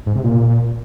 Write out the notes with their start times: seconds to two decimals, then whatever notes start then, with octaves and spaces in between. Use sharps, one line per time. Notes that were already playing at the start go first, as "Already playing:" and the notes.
0.06 G#2
0.15 C3
0.24 A#2